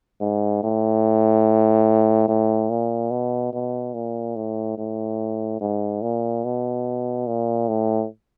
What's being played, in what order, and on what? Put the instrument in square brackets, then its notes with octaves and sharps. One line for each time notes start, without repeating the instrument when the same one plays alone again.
[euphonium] G#2
A2
A2
A#2
B2
B2
A#2
A2
A2
G#2
A#2
B2
A#2
A2